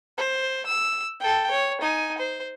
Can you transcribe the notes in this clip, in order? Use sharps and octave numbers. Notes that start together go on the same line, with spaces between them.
C5
E6
A4 G5
C#5
D#4 G#5
C5